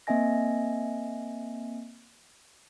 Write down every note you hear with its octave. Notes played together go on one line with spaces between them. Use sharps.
A#3 C4 D#5 E5 G#5 A#6